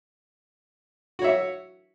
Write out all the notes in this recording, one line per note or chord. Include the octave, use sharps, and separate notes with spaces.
F#4 C#5 E5